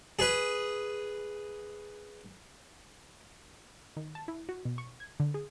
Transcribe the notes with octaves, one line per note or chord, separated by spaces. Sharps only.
G#4 B4
D#3
A5
E4
F#4
B2
C#6
G#6
D3
G#4